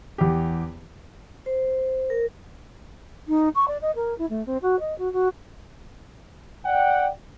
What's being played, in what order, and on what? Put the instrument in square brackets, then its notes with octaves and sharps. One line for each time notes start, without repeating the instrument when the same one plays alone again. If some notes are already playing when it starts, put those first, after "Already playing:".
[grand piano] E2 G4
[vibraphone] C5
A#4
[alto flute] D#4
C#6
D5
D#5
A#4
E4
A3
C4
F#4
D#5
F#4
F#4
[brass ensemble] D5 F#5 G5